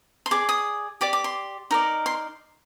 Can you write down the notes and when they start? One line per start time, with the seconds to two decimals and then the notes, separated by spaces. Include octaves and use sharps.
0.26 C6
0.31 G#4 D5 D6
0.49 D#6
1.01 G4 D5 D6
1.13 D6
1.24 C6
1.71 D#4 A#4 D5
2.06 C6